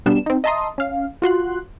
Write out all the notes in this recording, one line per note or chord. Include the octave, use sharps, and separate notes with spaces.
B2 G3 B3 D4 E7
C4 D#4
D#5 E5 A5 A#5 C6 D#6
C#4 F5
F4 F#4 C6 F#6